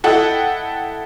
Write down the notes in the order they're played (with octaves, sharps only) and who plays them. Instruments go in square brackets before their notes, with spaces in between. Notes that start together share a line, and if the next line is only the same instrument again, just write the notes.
[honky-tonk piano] E4 A4 D#5 F#5 G5